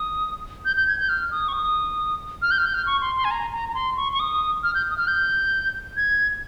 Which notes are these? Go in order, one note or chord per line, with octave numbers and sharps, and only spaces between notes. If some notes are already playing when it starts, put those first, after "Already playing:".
Already playing: D#6
G6
G6
G#6
G6
F6
D#6
C#6
D#6
F6
G6
F6
G6
F6
C#6
C6
C6
G#5
A#5
A#5
A#5
C6
C#6
C#6
D#6
F6
G6
D#6
F6
G6
G#6